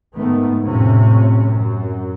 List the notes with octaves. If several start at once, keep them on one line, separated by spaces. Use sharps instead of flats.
G#2 D#3 A3 B3
F2 A2 C3 C#4
F#2